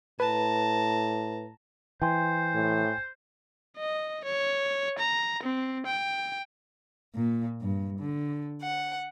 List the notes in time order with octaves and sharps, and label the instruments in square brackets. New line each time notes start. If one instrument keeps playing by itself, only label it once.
[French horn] A2 [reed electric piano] B4 [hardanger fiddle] A5 A#5
[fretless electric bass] E3 [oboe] C5 [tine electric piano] G5 G#5 C6
[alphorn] A2
[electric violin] D#5
C#5
A#5
C4
G5
[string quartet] A#2
G2
D3
F#5